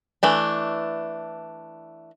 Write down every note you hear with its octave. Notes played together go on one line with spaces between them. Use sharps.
E3 A3 D4